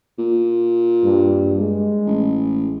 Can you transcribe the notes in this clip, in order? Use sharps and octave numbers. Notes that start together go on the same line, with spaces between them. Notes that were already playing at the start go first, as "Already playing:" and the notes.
A#2
G2
G#3
A1